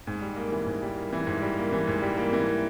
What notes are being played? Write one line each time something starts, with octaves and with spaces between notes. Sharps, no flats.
G#2
G3
A#3
E3
G#2
G3
A#3
E3
G#2
G3
A#3
E3
G#2
G3
A#3
E3